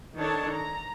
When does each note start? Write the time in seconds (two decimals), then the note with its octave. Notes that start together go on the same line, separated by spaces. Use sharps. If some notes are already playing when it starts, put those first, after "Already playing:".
0.16 D#3 D4 A4 C#5 A5
0.53 A#5